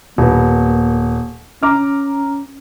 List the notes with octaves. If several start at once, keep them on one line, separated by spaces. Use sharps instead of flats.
D#1 A#3 B3
C#4 A#5 D6 F6